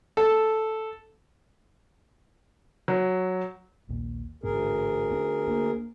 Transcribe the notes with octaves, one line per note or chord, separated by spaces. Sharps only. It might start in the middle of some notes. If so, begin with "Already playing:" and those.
A4
F#3
A#1 D#2 A#2
A1 D2 G#2 C#4 G#4 A#4
B3 C#4 D4
A#3 D4